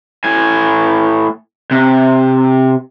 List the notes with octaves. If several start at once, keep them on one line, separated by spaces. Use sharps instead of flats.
A2 G#5
C3